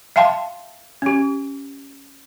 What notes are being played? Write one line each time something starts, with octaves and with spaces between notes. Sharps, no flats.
E5 F5 G5 A5 C6
C#4 G4